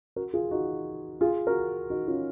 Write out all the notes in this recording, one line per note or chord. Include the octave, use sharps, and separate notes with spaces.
F#4 A#4
F4 G#4
D#4 F#4
F4 G#4
F#4 A#4
D#4 F#4
C#4 F4